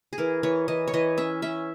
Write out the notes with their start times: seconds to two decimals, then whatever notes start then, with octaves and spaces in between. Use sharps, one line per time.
0.13 G#4
0.18 E3 A#4
0.43 E3 C#5
0.68 E3 D#5
0.88 C#5
0.94 E3 D#5
1.18 C#4 E5
1.42 C#4 E5